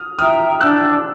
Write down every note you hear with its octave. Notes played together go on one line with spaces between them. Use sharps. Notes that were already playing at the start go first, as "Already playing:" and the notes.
Already playing: D#6 F6
E5 G5 A#5 D#6 F6
D4 E6 F#6